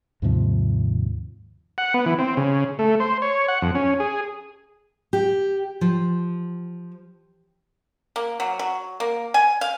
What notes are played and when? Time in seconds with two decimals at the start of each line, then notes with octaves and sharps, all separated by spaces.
0.22 D#2 G#2 C3 F3
1.78 F#5
1.94 B3
2.06 E3
2.19 C4
2.37 C#3
2.79 A3
3.00 C5
3.22 C#5
3.48 F#5
3.62 F2
3.75 C#4
4.00 G#4
5.13 G4
5.81 F3
8.16 A#3
8.40 F#3
8.59 F#3
9.00 A#3
9.34 G#5
9.61 F5